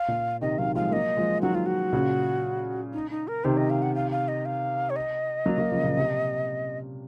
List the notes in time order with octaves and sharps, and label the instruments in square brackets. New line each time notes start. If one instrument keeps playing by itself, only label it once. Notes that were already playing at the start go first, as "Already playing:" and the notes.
Already playing: [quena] F5
[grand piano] A#2
[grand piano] C3 D#3 [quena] D#5
[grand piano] D#3 F#3 [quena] F5
[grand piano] F3 G#3 [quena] F5
[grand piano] F#3 A#3 [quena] D#5
[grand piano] F3 G#3
[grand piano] D#3 F#3 [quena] F#4
[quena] F4
F#4
[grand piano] A#2 C#3
[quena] D#4
D#4
A#4
[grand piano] C3 D#3 [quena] C5
[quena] D#5
F5
F#5
F5
F5
D#5
F5
C#5
D#5
[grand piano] F#3 A#3
F#3 A#3
C#3 F3
A#2 C#3
C3